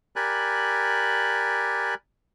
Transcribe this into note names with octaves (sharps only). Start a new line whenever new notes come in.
G4 A#4 D5 G#5 B5 F#6